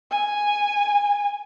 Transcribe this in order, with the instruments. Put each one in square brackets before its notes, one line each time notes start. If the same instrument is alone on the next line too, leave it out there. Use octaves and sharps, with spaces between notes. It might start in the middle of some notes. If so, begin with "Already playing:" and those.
[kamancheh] G#5